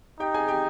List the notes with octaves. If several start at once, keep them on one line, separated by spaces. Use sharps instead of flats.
D#4 G4 G5
G#4 G#5
G4 G5